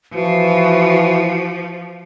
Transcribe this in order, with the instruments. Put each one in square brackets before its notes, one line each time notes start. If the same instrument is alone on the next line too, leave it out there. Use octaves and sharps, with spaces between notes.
[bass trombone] E3 [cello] F3 [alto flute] F#4